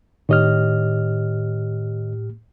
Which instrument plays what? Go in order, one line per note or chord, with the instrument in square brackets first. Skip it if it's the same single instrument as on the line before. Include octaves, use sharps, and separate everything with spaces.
[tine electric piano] A2 G4 F6 [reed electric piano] D#3 C#5 D#5